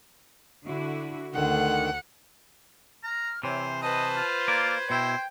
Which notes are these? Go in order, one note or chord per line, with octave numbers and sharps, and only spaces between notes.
D3 E4 F#4
D2 D3 D#3 F#5
A#5 F6
C3 E3 C5 C#5
B4 C5 D#5 A5
F4
A#3 D5 G#6
B2 E4 C5 G5